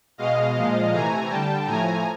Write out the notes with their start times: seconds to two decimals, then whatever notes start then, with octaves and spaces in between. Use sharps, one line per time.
0.18 B2 G#3 D#5 F5
0.55 A#2 F3 G#3
0.92 C3 E3 A3 G#5 A#5
1.29 D3 G3 G5 A5
1.67 A2 F3 A3 G#5 A#5